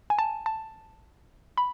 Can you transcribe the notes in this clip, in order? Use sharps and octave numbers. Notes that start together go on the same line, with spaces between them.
G#5
A5
A5
B5